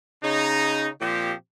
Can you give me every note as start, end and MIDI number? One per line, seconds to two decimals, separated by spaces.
0.24 0.88 49
0.24 0.88 63
1.01 1.33 46
1.01 1.33 53
1.01 1.33 60
1.01 1.33 67